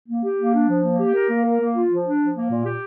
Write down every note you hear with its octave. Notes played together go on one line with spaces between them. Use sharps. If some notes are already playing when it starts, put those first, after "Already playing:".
A#3
G4
A#3
D4
F3
A#3
G4
A#4
A#3
A#4
A#3
F4
F3
D4
F3
A#3
A#2
G4